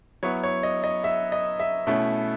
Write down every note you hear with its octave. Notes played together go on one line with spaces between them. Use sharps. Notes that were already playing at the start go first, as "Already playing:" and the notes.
F#3 B3 E4 C#5
C#5
D#5
D#5
E5
D#5
E5
B2 A3 C#4 E4